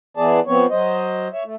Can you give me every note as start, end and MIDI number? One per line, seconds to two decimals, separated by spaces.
0.17 0.40 52
0.17 0.40 59
0.17 0.40 68
0.17 0.40 74
0.17 0.40 81
0.47 0.66 53
0.47 0.66 59
0.47 0.66 60
0.47 0.66 73
0.71 1.28 54
0.71 1.28 72
0.71 1.28 75
1.33 1.43 73
1.33 1.43 76
1.44 1.56 57